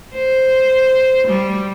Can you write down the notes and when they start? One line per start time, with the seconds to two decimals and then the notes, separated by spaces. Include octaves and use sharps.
0.14 C5
1.27 G3